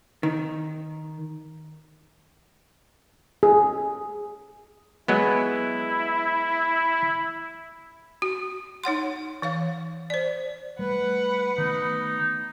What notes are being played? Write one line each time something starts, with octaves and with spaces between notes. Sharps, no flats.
D#3
G#4
F#3 G#3 B3 E4
F#4
D#4 C#5 F#5 C6
E3 C#5 F5
C5 D5
G3 A3 B4 F#5
D#3 A3 B3 D#4